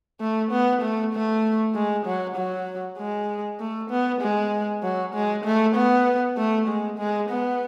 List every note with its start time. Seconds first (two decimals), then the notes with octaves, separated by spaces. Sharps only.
0.21 A3
0.51 B3
0.82 A3
1.13 A3
1.75 G#3
2.06 F#3
2.36 F#3
2.98 G#3
3.60 A3
3.90 B3
4.21 G#3
4.83 F#3
5.14 G#3
5.44 A3
5.75 B3
6.37 A3
6.68 G#3
6.98 G#3
7.30 B3